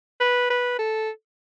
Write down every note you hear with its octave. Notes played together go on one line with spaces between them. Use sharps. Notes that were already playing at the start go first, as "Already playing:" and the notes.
B4
B4
A4